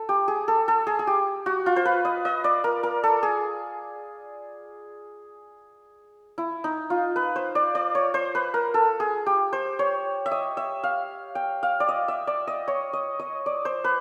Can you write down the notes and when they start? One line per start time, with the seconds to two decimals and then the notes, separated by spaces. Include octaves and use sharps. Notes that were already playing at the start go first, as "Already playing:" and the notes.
Already playing: A4
0.09 G4
0.28 G#4
0.48 A4
0.68 A4
0.87 G#4
0.99 G#4
1.07 G4
1.46 F#4
1.66 F4
1.76 C5
1.85 B4
2.05 D#5
2.25 D#5
2.44 D5
2.64 A#4
2.83 A#4
3.03 A4
3.23 G#4
6.38 E4
6.64 D#4
6.90 F4
7.16 B4
7.36 C5
7.55 D5
7.75 D5
7.95 C#5
8.14 C5
8.35 B4
8.54 A#4
8.74 A4
9.00 G#4
9.26 G4
9.53 C5
9.79 C#5
10.26 E5
10.31 D#5
10.57 E5
10.83 F5
11.35 G5
11.63 F5
11.80 D5
11.89 D#5
12.08 E5
12.27 D5
12.47 D#5
12.68 C#5
12.93 D#5
13.19 D#5
13.46 D5
13.65 C5
13.84 B4